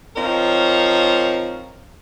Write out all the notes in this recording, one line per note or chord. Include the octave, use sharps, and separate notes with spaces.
F3 C4 D#4 A#4 C#5 F5